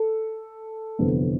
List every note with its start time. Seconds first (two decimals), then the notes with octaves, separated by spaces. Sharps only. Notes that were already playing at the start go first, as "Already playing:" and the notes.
Already playing: A4
0.99 G1 F2 C3 E3 B3